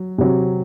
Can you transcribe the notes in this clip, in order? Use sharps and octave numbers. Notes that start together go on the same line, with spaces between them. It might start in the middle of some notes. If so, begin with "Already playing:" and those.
Already playing: F#3
C3 F#3